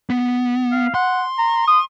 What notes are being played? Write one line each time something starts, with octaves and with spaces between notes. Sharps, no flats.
B3
F5
F#5 C6
A#5
D#6